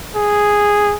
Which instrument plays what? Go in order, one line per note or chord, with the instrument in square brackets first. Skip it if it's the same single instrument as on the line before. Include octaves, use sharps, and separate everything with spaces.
[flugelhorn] G#4